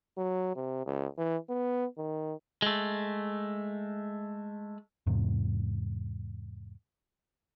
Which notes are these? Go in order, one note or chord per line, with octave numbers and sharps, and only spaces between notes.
F#3
C3
C#2
E3
B3
D#3
G#3 A3
E2 G#2 C3